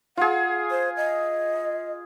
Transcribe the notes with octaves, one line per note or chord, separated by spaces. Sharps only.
F4 G#4 F#5
C5
D#5